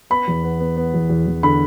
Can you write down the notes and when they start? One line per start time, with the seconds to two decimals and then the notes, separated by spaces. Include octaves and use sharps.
0.10 B3 B5
0.28 E2
0.44 B3
0.60 B3
0.77 B3
0.94 E2
1.10 E2
1.27 E2
1.43 D3 B5